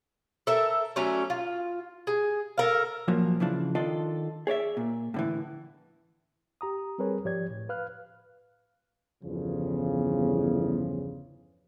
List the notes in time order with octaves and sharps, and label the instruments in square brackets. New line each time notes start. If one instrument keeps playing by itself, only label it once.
[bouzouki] A4 A#4 E5
F#3 A3 C#4 D4
F4
G#4
A4 A#4 F5
[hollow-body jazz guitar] A#2 F3 F#3 A#3
C#3 E3 F3 D4
D#3 D4 F4 A4 D5 D#5
G#4 C#5 D5 E5
A#2
A2 D3 E3
[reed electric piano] G4 A#5 D#6
G3 C4 G#4 A#4 B4 C#5
G#2 F3 G4 C#5 D5 G#6
A2
B4 F5 F6 F#6
[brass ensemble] G1 E2 C#3 F3